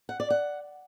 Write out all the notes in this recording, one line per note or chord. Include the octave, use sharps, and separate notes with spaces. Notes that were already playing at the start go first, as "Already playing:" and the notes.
F#5
D5
F#5